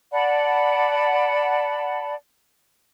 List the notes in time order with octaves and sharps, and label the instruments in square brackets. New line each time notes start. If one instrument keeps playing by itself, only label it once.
[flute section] D5 F#5 A5 B5